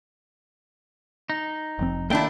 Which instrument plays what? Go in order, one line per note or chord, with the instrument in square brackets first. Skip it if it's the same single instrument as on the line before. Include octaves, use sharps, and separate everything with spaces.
[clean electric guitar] D#4
[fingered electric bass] F1 F3 C4
[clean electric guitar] D#2 A#3 G5 [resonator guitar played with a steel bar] A3 D4 E4